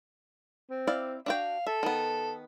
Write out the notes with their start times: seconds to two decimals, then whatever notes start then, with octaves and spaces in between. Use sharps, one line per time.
0.70 C4
0.87 E4 D5 F5
1.26 D4 F#4 F5 G5
1.67 A4 E5
1.83 D#3 B3